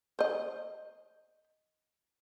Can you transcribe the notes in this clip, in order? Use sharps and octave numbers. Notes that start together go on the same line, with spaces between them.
C5 D#5